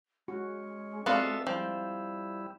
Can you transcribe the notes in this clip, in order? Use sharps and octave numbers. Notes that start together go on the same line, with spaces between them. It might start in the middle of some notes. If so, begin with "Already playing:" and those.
G#3 C#4 F#4
B3 C4 F4 F#4 A4 D5 E5 F5
F3 G3 E4 G5